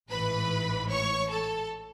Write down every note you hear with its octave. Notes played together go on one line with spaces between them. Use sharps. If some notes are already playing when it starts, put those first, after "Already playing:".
A1 G#2 E3 B4 B5
C#5 C#6
A4 A5